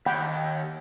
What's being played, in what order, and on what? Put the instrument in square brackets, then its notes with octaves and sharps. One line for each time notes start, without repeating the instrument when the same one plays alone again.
[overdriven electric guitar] D#2 [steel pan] F#5 G5 B5